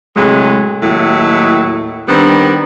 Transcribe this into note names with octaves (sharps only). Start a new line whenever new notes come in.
A2 C3 F#3 G#3
D#2 A2 F#3 E4
D#3 G3 B3 C4 D4